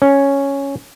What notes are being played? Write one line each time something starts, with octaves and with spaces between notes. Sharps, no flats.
C#4